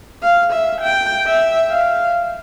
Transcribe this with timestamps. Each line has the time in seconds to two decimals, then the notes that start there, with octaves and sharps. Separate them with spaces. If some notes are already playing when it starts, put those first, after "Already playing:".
0.23 F5
0.53 E5
0.81 G5
1.27 E5
1.70 F5